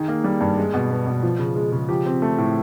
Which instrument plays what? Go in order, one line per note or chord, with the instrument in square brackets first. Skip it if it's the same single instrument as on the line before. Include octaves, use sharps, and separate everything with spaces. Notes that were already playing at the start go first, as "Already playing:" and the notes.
Already playing: [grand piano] D#3 G#4
A#3
G3
G2
G#3
B2
B3
B2
F3
C#3
G#3
C#3
F3 G4
C4
A3
A2